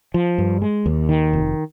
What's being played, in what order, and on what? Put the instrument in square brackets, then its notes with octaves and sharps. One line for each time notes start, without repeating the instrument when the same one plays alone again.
[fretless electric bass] F3
G2
G#3
D#2
D#3
F1